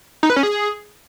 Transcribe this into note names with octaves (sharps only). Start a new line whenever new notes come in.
D#4
B4
C#4
G#4